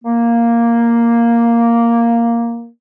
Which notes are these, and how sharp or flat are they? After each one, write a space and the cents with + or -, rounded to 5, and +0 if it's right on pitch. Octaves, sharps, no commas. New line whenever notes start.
A#3 +0